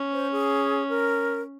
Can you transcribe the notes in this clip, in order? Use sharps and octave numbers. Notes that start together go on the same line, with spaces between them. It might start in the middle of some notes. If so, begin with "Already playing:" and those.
Already playing: C#4
C5
G#4
A#4